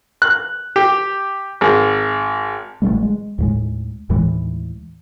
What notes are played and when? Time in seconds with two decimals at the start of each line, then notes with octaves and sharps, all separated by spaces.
0.22 F#6
0.76 G4
1.61 G#1
2.82 A1 D#3 G3 A3
3.03 G#3
3.38 D#2 A2 G#3
4.10 D#2 A2 E3 G#3